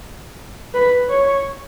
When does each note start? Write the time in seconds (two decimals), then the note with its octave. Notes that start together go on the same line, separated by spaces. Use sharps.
0.74 B4
1.09 C#5